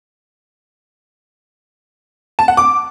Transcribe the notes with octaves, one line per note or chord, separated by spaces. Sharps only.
A5
F#5
D6